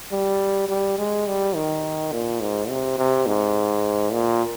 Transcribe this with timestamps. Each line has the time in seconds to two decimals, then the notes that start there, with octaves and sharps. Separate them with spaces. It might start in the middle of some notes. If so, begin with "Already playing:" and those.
0.12 G3
0.69 G3
0.98 G#3
1.27 G3
1.55 D#3
2.12 A#2
2.41 G#2
2.69 C3
2.98 C3
3.26 G#2
4.12 A#2